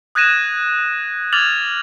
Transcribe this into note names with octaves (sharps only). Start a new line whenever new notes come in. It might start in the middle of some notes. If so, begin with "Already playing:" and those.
D#6 F#6 G#6 A#6 D#7 E7
D6 F6 G#6 A6 F7 F#7